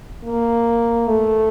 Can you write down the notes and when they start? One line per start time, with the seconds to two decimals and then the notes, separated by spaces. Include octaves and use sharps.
0.25 A#3
1.07 A3